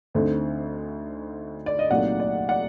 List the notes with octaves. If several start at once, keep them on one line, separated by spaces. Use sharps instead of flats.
D2 D3 A3 C4 D#4
D5
D#5
C2 A#2 F#3 A3 D#4 D5 F#5
D5
D5 F#5